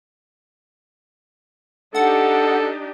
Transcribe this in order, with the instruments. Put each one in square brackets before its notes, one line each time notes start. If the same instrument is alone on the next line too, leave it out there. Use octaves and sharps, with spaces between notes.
[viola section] D4 D#4 G4 [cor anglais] A4 [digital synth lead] F#5